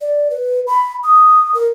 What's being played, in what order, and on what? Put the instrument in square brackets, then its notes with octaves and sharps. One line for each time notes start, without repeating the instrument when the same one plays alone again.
[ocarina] D5
B4
B5
D#6
A#4